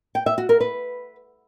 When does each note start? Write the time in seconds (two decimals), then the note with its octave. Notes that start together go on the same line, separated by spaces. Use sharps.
0.15 G5
0.26 E5
0.38 F#4
0.49 A#4
0.60 B4